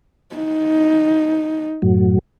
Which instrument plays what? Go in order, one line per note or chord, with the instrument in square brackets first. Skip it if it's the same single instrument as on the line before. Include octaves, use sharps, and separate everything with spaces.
[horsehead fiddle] D#4
[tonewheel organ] F#2 A2 F#3